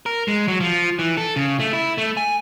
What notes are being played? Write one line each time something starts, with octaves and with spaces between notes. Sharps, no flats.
A#4
G#3
F#3
F3
E3
A4
C#3
A3
E4
A3
G#5